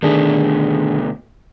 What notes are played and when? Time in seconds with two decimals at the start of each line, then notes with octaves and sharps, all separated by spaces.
0.02 B2 D3 D#3 A3 D4 G#4